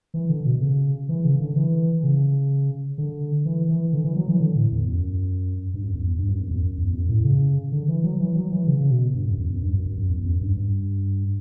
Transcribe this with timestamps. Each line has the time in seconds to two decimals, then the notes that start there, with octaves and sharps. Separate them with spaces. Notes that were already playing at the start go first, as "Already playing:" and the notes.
0.14 E3
0.29 D3
0.45 B2
0.61 C#3
1.09 E3
1.24 C#3
1.40 D3
1.56 E3
2.03 C#3
2.98 D3
3.45 E3
3.69 E3
3.93 D3
4.04 E3
4.16 F#3
4.28 E3
4.40 D3
4.55 A2
4.72 E2
4.88 F#2
5.74 G2
5.83 F#2
5.94 E2
6.18 G2
6.29 F#2
6.40 E2
6.51 F#2
6.77 E2
6.93 F#2
7.09 A2
7.24 C#3
7.72 D3
7.88 E3
8.03 F#3
8.19 E3
8.35 F#3
8.51 E3
8.67 C#3
8.79 C#3
8.90 B2
9.14 G2
9.26 F#2
9.38 E2
9.50 F#2
9.61 G2
9.73 F#2
9.85 F#2
9.97 F#2
10.09 E2
10.24 F#2
10.41 G2
10.57 G2